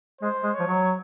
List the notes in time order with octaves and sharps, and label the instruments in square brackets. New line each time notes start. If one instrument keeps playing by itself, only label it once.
[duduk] G#3 [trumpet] C5
[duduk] G#3
[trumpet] C#5
[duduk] F3
F#3